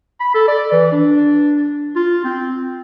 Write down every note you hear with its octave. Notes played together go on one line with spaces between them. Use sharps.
B5
A4
D5
E3
D4
F4
C4